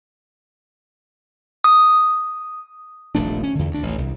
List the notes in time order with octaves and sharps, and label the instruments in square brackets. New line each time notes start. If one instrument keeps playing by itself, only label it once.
[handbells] D#6
[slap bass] D#1 A#1 A3 D4
C#4
E2 D3
D2 D4
A1 D2
C2